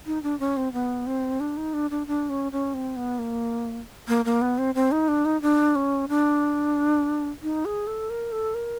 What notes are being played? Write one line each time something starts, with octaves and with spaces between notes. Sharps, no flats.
D#4
D4
C#4
C4
B3
C4
D4
D#4
D4
D4
D4
C#4
C#4
C4
B3
A#3
A#3
A#3
B3
C4
C4
D#4
D4
D#4
D4
C#4
D4
D#4
G#4
A4
A#4
A4
A#4